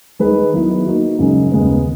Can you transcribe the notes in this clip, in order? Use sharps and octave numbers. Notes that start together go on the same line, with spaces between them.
D#3 G#3 D#4 G#4 B4
D#3 F#3 B3 E4
D#3 A#3 D#4 F#4
F#2 C#3 G#3 D#4
D#2 C#3 G#3 B3